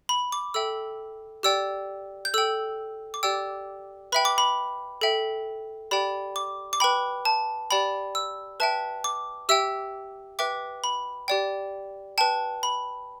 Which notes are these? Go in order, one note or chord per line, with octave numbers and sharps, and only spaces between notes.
B5
D6
A4 E5 G5 E6
G4 D5 G5 E6
G6
A4 G5 E6
D6
G4 D5 G5 E6
B4 E5 G5 B5
D6
B5
A4 E5 G5
G4 D5 G5 B5
D6
D6
B4 G5 B5
A5
G4 D5 G5 B5
E6
B4 E5 G5 A5
D6
G4 E5 G5 E6
B4 E5 G5 D6
B5
G4 D5 G5
B4 G5 A5
B5